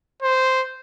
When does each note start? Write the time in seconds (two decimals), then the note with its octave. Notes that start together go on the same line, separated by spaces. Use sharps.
0.22 C5